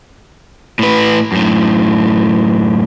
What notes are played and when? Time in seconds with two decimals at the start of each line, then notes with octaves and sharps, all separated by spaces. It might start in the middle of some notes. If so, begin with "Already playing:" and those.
0.79 A2 B4
1.32 F#2 A2